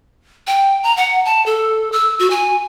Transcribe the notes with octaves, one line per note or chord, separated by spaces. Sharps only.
G5
A#5
F#5
A5
A4
E6
F#4
G#5